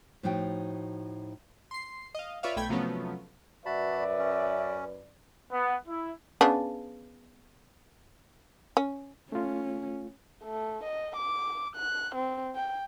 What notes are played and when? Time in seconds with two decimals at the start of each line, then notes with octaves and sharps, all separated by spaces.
0.23 A2 F3 D#4 F#4 G5
1.71 C6 C7
2.15 D#5 F5
2.43 F4 B4 C#5 D5 E5 F5
2.56 B1 A3 G5 B5 G#6
2.69 C3 F3 F#3 A3 B3 C#4
3.66 F#2 F#4 B4 D5 E5 A5 B5
4.19 C#4
5.52 B3
5.87 E4
6.41 C#3 B3 D4
8.77 C#4
9.32 A3 C#4 F4
10.44 A3
10.83 D#5
11.16 D6
11.76 F#6
12.15 C4
12.55 G5